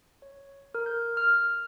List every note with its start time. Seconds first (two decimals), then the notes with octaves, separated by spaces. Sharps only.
0.22 C#5
0.75 A#4
0.86 G6
1.17 F6
1.48 F6